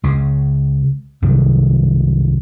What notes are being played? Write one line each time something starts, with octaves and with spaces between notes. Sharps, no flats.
C#2 C#3
C2 G2 D#3 F#3